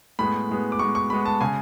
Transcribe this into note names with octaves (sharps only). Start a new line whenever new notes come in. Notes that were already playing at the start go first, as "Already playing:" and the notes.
A2 G#3 B3 B5
A2 G#3 B3
D6
A2 G#3 B3 C#6
C#6
A2 G#3 B3 B5
A5
C#3 G#3 G#5